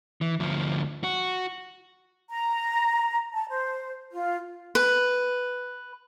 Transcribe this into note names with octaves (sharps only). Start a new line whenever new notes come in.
E3
D2 F3
F#4
A#5
A5
C5
F4
B4